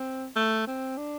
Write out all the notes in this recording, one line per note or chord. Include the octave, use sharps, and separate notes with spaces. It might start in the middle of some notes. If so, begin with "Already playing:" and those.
Already playing: C4
A3
C4
D4